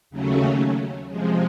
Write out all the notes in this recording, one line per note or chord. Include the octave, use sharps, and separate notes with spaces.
D#2 C#3 F#3 A3 C#4
C3 F3 G#3